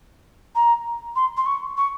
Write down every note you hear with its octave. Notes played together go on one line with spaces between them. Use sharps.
A#5
C6
C6
C#6
C#6